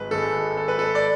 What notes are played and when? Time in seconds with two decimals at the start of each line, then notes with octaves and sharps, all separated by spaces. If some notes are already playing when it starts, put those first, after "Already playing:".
Already playing: G#1 G#2 G#3 B4
0.11 G#1 G#2 G#3 A4
0.57 A4
0.68 B4
0.79 A4
0.95 D5